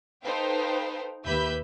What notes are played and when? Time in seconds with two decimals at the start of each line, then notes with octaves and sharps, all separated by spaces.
0.24 D#4 A4 B4 C5 F5 G5
1.25 D#2 G4 B4 E5 B5 G6